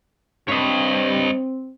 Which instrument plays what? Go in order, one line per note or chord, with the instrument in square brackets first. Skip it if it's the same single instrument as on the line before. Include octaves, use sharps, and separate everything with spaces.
[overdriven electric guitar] G2 [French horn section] C4 [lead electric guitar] C#5 D#5